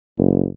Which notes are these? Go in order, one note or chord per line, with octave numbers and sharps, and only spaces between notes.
F#1